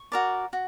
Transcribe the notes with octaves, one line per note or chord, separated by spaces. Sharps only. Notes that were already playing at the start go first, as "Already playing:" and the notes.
Already playing: C#6
F#4 A#4 D5
F#4